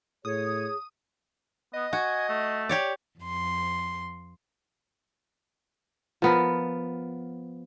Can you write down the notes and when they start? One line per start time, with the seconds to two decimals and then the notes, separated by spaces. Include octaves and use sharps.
0.25 A2 G#4 C#5 D#6
1.74 B3 D#5
1.93 F#4 G#5
2.29 A3
2.69 G4 C#5 D5
3.19 F2 C6
6.22 F3 B3 A#4